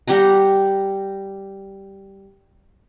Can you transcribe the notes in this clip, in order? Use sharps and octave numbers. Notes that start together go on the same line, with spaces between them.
G3 G4 F#5 A#5